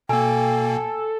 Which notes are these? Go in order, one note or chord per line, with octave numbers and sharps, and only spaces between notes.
B2 A#3 A4 G5 G#5